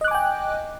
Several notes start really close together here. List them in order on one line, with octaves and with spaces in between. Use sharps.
D#5 F#6 D6 G#5 G5